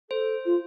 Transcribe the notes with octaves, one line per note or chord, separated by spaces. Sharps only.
A4 C5
F4